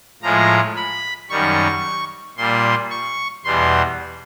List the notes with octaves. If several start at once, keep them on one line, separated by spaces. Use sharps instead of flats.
A2 F3 G#3 A#5
B5
F#2 D#3 G3 C#6
A#2 G3 C6
C#6
E2 B2 G3 C6